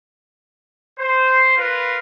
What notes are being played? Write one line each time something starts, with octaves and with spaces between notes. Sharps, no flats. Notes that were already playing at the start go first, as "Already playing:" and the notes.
C5
F4 A#4 B4